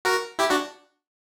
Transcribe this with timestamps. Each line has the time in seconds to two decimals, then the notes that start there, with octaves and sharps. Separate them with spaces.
0.05 F#4 A#4
0.39 E4 G4
0.50 D4 F#4